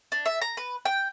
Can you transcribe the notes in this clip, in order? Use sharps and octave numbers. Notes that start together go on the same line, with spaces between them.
D4
E5
A#5
B4
G5